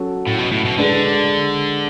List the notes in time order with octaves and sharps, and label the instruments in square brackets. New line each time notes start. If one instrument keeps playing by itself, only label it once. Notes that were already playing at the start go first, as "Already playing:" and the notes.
Already playing: [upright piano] F#3 C#4 F#4 A4
[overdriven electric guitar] A2
B2
A2
B2
[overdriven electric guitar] D3 [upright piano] G#3 D4 G#4 B4